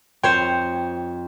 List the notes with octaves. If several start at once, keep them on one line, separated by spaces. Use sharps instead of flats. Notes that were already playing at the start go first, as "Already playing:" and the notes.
F2 C5 C#5 G5